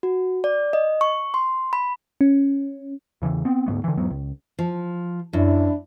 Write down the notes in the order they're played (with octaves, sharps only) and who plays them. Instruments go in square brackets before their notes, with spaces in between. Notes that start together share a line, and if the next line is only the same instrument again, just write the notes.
[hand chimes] F#4
D5
D#5
C#6
C6
B5
[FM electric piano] C#4
[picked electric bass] E2 C#3 E3
B3 C4
D2 G#2 A3 B3
D3 E3
E2 G#2 F#3 B3
C#2
[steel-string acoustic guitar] F3
[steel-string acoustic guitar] F#2 [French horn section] D4 E4